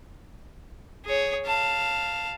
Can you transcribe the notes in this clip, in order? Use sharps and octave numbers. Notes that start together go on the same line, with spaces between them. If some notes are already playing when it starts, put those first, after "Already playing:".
G#4 C#5
F5 A5